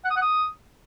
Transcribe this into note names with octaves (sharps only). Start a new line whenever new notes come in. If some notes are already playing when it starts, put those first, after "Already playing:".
F#5
D#6
F#5
D#6